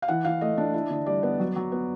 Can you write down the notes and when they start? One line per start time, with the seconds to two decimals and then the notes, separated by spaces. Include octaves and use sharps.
0.02 F5
0.08 E3 F#5
0.25 E3 F5
0.41 A3 D#5
0.58 D4
0.74 E4
0.90 D3
1.06 G3 D5
1.23 B3
1.39 F#3
1.56 F#3
1.72 B3